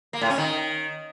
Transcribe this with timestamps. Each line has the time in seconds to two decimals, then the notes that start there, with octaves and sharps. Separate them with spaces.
0.13 A#3
0.21 A2
0.30 C#4
0.38 D#3